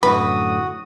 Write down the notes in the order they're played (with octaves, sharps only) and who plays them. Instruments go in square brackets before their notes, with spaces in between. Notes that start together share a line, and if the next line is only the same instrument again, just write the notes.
[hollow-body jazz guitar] F#2 A2 D3 [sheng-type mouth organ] F#4 [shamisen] B4 [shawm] D#6